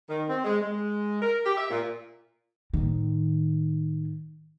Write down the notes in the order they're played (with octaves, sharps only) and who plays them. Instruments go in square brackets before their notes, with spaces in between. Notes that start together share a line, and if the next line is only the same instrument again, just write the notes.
[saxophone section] D#3
C4
G#3
G#3
A#4
G4
E5
A#2
[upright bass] A2 D#3